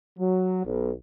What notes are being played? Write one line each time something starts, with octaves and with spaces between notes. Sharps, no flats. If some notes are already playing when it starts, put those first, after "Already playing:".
F#3
B1